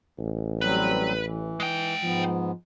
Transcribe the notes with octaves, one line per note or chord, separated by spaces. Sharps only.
A1
F#3 G3 C4 B4
E3
G#3 G5
G#2 F3 B3